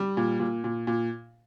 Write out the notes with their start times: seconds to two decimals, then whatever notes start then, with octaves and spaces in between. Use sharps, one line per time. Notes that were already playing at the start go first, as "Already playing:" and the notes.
Already playing: G3
0.17 A#2
0.40 A#2
0.64 A#2
0.87 A#2